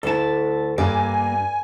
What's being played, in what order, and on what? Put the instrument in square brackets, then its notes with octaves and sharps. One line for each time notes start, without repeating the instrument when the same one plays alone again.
[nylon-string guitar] D2 E4 [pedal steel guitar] A4 A5
[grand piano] G2 [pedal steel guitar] A#3 [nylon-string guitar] D5 [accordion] G#5